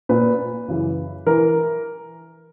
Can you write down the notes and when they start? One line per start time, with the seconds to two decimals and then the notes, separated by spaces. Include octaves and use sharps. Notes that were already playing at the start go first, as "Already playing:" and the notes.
0.09 A#2 B4
0.68 F#2 C#3 E3
1.26 E3 A#4